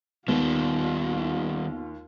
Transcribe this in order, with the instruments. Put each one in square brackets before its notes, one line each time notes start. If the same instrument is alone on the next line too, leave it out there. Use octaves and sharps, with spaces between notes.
[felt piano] D#2 [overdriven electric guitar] D#3 G3 [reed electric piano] B3 [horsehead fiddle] F4